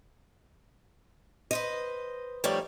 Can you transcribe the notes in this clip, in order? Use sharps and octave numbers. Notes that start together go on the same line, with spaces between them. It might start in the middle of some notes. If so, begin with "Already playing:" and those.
B4 C5 D#5
F3 G3 A3 D#4 C#5 D5